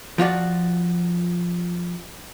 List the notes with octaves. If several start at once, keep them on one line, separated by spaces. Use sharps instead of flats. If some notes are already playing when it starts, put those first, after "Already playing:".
F3 F4 F#4 D5